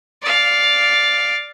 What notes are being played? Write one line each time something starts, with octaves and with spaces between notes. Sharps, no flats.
D5 F5